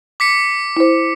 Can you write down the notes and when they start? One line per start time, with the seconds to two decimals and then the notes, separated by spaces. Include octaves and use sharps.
0.20 D6 B6 C#7
0.77 E4 C5